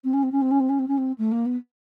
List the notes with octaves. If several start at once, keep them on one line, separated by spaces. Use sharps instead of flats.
C4
C#4
C4
C#4
C4
C#4
C4
C#4
C4
C#4
C4
A3
A#3
B3